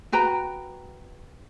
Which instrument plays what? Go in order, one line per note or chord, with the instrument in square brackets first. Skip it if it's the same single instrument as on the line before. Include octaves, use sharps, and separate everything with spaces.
[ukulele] F#4 B4 G5 A#5